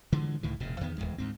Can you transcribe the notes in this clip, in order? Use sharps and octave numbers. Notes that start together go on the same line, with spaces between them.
D3 E3 F3 G#3
C#2 A2 D#3 E3
E1 A#2 C#3
E2 D#3 B3
D1 A#1 E2 G#3
D2 G#2 C4